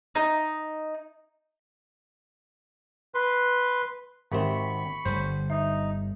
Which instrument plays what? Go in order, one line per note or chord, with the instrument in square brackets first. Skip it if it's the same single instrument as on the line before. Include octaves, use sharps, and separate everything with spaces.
[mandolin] D#4
[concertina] B4 C6
[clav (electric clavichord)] G#1 C4 [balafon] G4 A#4 E5 [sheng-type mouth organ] B5 C#6
[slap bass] G1 D3 G3 [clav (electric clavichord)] C5
[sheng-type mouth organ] D#4 [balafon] D#5 E5